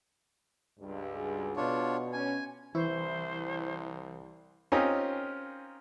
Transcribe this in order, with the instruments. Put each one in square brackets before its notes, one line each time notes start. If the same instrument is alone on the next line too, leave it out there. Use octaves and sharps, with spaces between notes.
[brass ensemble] C#2 G2
[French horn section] F#4 G#4
[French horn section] B2 [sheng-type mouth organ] D4 F4 C#5
[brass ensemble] C#4 [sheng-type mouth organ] G#5
[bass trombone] C2 [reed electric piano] E3 C#6 [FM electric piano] E4 [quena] C5
[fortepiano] C4 C#4 D#4 F4 G4 A#4